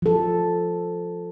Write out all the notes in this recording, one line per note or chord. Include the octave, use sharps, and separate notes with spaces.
F3 A4